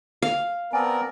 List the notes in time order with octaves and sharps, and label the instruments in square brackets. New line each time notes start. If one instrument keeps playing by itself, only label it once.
[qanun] F5
[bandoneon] B3 C4 D5 [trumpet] A#4 [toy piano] G#5 A5